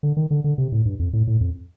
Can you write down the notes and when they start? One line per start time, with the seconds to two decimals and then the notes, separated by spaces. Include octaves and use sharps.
0.03 D3
0.17 D#3
0.31 D3
0.44 D3
0.58 C3
0.72 A2
0.85 G2
0.99 F2
1.13 A2
1.27 A2
1.40 F2